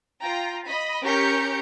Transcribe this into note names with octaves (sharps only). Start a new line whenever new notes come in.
F4 G5 A#5
D#5 B5
C#4 G4 A#4 A#5 G6 C#7